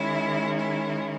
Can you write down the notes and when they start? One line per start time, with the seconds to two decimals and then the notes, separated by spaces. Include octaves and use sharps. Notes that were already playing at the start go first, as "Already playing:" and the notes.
Already playing: D#3 G#3 C#4 E4
0.57 E4